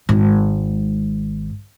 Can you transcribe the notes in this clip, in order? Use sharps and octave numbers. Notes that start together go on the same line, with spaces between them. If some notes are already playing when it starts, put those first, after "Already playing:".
G#1 G#2